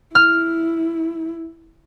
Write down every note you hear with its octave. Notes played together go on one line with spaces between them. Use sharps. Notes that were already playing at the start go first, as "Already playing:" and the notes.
E4 F6